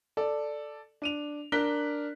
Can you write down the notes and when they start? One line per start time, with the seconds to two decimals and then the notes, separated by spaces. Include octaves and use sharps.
0.17 A4 D5
1.02 D4 D#7 F7
1.52 D4 A#4 F#6 B6 G7